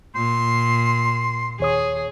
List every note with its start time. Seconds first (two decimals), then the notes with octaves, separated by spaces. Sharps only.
0.15 A#2 C6
1.60 D#2 G#4 C#5 D#6